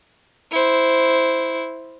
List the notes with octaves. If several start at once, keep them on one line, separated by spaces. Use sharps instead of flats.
E4 C5